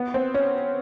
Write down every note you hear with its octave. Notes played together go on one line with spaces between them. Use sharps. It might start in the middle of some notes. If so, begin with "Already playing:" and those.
Already playing: B3
C4
C#4